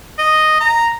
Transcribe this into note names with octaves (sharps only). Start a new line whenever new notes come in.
D#5
A#5